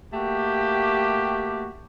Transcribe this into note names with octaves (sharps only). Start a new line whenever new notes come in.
A3 A#3 F#4 G4